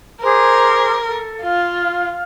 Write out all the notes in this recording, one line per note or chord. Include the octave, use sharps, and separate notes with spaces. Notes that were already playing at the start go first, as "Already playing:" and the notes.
G#4 A#4 C5 D6
A4
F4 F5